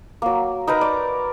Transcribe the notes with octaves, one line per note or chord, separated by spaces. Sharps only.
F#3 A#3
D#4 A#4 B4 A#5
D5